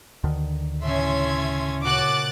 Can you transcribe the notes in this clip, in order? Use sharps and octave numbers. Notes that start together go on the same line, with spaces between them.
D2 D3 D#3
A2 C#3 A3 C#4 E5 C6 G#6
A#2 C#3 F#4 D6 F#6 A6